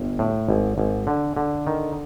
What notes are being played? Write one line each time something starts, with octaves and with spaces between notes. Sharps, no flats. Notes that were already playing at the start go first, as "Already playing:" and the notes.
Already playing: G1
A2
G#1
G#1
D3
D3
D#3